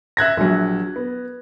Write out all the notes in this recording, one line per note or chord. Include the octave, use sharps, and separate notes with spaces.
E5 F#6 G#6 A#6
A#1 F#3
B3